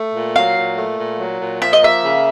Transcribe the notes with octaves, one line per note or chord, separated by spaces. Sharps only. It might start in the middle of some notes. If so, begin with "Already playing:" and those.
Already playing: A3
A#2
F#3 F5
A#2
A3
A#2
F#3
A#2
F3 E5
D#5
A#3 E5
C#3